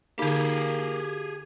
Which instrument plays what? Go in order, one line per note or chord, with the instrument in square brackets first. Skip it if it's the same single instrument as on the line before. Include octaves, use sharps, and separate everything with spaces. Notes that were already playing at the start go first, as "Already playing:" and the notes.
[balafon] D3 D#4 [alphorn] A#3 [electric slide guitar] G4 G#4